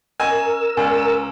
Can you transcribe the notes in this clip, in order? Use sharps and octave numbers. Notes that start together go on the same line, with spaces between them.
C#4 A#4 D#5 G#5 E6
C#2 D5 G#5